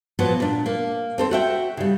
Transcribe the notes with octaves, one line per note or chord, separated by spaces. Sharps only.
A#2 F3 F#3 B3 F#4
A#2 D4
A#3
C4 A4 C5
F#4 E5 G5
C#3 G3